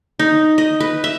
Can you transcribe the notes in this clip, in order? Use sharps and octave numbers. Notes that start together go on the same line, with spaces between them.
D#4
D#5
B4
E5